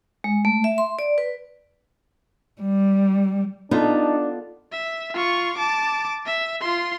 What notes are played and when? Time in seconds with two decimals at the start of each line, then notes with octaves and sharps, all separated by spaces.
0.24 G#3
0.45 A3
0.64 E5
0.78 C6
0.99 D5
1.18 B4
2.61 G3
3.71 B3 D4 D#4 F4 A4
4.72 E5
5.14 F4 C#6
5.57 A5 D6
6.26 E5
6.61 F4 C6